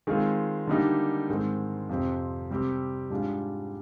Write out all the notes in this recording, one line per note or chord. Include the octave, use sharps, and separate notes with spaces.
D#3 G#3 C4 F4 G#4
D3 G3 A#3 D#4 G4
G#2 D#3 G#3 C4
F2 C3 F3 C4
C3 G3 C4 G4
G#2 G3 D4 F4 G#4